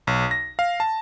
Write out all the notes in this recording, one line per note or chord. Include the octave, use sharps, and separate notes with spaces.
B1
A#6
F5
A5